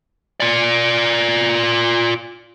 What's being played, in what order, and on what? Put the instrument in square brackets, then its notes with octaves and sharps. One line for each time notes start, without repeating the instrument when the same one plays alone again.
[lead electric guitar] F4 D5